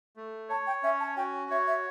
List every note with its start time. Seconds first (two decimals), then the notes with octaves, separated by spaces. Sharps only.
0.17 A3
0.49 C#5 A5
0.67 G5
0.83 C#4 E5
1.00 A5
1.17 F#4 G5
1.51 C#5 E5
1.67 E5